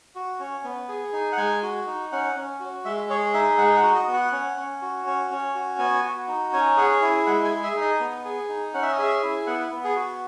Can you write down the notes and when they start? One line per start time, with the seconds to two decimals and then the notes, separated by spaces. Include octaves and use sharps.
0.15 F#4
0.39 C#4
0.64 B3
0.89 G#4
1.13 D#4
1.32 F#5
1.37 G#3 G#5
1.63 F#4
1.87 D#4
2.12 C#4 F#5
2.36 C#4
2.60 F#4
2.85 G#3 E5
3.10 G#4 C#5
3.33 D#4 E5
3.58 G#3 F#5
3.76 F#5
3.83 F#4
3.95 D#5
4.08 B3
4.13 F#5
4.32 C#4
4.57 C#4
4.82 F#4
5.06 C#4
5.31 C#4
5.55 F#4
5.79 B3 G#5
6.04 F#4
6.28 D#4
6.53 C#4 G#5
6.77 G#4 F#5
7.02 E4 G#5
7.27 G#3 F#5
7.45 G#5
7.50 G#4
7.63 E5
7.76 D#4
7.81 D#5
8.01 B3
8.25 G#4
8.49 D#4
8.74 C#4 F#5
8.82 E5
8.92 D#5
8.99 G#4 E5
9.22 E4
9.47 B3 F#5
9.72 B3
9.84 G#4
9.96 F#4